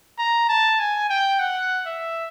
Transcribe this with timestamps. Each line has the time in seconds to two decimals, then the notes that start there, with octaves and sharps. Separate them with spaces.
0.19 A#5
0.49 A5
0.79 G#5
1.10 G5
1.40 F#5
1.86 E5